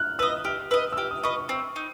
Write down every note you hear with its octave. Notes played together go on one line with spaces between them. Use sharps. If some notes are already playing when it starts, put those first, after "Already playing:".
Already playing: F6 F#6
B4 D#5 E6
G4 F6
B4 D#5 E6
E6
G4 F6
D#6
B4 D#5 C#6
C#6
C4
D#4